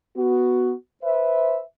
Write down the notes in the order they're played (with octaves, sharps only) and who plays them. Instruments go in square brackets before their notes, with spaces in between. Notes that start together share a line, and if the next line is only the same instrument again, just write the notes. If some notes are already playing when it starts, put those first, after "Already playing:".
[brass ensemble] B3 F#4
B4 C5 E5